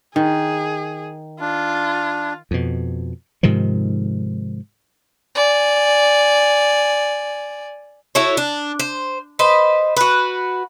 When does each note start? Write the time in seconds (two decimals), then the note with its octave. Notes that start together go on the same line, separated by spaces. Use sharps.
0.16 D#3 G#4
1.40 D4 F4
2.51 F2 B2
3.43 G#2 C3 D#3 F3
5.35 D5 G#5
8.15 E4 F#4 A4 C#5
8.37 D4
8.79 C5
9.39 B4 C5 D#5
9.97 F#4 B4